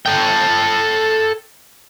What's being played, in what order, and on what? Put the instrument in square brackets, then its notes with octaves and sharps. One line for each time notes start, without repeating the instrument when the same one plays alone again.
[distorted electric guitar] A4 G5